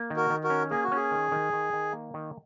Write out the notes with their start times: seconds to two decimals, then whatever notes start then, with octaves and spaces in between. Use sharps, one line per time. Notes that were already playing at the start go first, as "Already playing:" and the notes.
Already playing: A#3
0.10 D#3
0.16 F#4 A#4
0.30 D#3
0.44 F#4 A#4
0.50 C#4
0.71 A#3 G#4
0.84 F#4
0.91 C#4 G#4
1.11 D#3
1.32 D#3
1.53 D#3
1.73 D#3
1.93 A#3
2.14 D#3